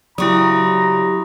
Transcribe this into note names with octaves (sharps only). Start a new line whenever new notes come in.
C#3 F#3 E4 G4 D5 A#5 C#6 D#6